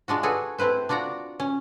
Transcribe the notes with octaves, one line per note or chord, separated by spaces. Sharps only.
G#3 D4 F4 F#4
F#4 G#4 A4 B4 C#5
A3 C4 E4 B4 C5
D4 F4 F#4 D5 A#5
C#4